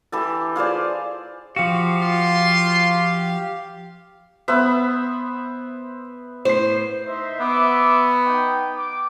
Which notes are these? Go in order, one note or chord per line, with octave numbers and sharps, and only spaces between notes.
E3 G4 A4
F4 G#4 C5 D5
F3 F#4 G4 F5
F4 C6
B3 C5 E5 B5
A2 C5 C7
D#4 C5 E5
B3 E5 D6
D#4 G5
D6